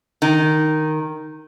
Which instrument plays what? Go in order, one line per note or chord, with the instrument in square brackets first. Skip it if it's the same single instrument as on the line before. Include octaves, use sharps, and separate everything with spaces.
[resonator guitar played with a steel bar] D#3